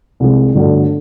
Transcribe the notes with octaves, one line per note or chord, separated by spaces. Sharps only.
C2 C3 F3 G#3
G1 G2 D3 F#3 A3